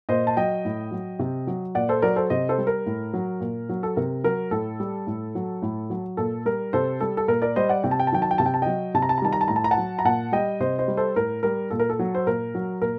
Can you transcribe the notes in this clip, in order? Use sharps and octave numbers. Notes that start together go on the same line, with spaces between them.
A#2 C5 D#5
A5
F#3 D#5 G5
A2
F#3
C3
F#3
A#2 D5 F#5
A4 C5
F#3 A#4 D5
A4 C5
C3 C5 D#5
A4 C5
G3
A#4
A2
F#3
A#2
F#3
A4
C3 A#4
F#3 A#4
A2 A4
G3
A2
F#3
A2
F#3
A#2 A4
G3 A#4
C3 A4 C5
G3 A4
A4
A#2 A#4
A#4 D5
G3 C5 D#5
D5 F#5
C3 G5
A5
G5
A5
D#3 F#3 G5
A5
G5
C3 A5
G5
A5
F#3 D#5 G5
C3 A5
A#5
A5
A#5
D#3 G3 A5
A#5
A5
A2 A#5
A5
A#5
F#5 A5
F#3
A#5
A#2 F#5 A5
G3 D#5 G5
C3 C5 D#5
C5 D#5
G3
A4 C5
A2 A#4
G3 A#4
A#2 A4
A#4
A4
F#3
C5
A#2 A#4
F#3
A#2 A#4